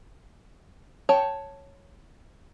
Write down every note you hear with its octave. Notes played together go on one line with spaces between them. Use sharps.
C#5 G5 A5